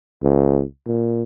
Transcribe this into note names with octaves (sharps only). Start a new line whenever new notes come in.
C#2
A#2